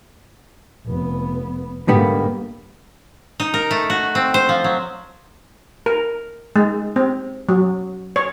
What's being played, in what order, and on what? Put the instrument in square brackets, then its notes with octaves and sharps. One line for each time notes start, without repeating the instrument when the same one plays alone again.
[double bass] F1 B3
[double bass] G#2 A#3 [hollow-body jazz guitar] D3 G3 B3
[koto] D#4
A#4
A3
F#4
C4
C5
F3
F#3
[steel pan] A#4
G#3
C4
F#3
C#5